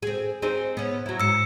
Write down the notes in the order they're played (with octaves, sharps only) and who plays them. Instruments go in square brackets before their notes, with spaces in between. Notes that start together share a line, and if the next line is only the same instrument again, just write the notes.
[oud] C4 G#4
C4 D#4 G#4
B3 C#4
F#3 E4
[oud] G#2 [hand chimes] E6 C#7